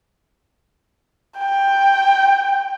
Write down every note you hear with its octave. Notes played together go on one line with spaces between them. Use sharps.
G5